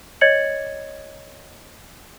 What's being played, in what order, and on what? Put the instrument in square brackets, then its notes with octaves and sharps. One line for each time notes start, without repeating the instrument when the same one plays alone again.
[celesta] C#5 D#5 G#6 A6 C#7 F#7